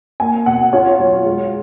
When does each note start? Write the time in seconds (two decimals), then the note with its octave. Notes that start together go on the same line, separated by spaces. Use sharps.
0.20 A#3 G#5
0.46 B2 F#5
0.73 F4 C#5
0.99 F#3
1.26 G#3